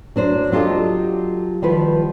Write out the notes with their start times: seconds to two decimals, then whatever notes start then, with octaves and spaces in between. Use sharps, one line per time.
0.16 F#3 D4 C5
0.52 F#3 F4 G4 A4 D#5
1.62 D#3 F3 G3 B4